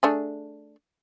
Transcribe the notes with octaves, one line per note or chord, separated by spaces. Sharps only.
A3 D4 G#4